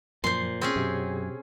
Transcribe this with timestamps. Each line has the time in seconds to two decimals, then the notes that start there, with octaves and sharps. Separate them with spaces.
0.24 F#2 A#2 F3 C5 C6
0.61 C4 C#4 G#4
0.76 F#2 B2 G4